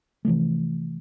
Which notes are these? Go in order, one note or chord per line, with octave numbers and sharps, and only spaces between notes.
C3 E3 F3 A3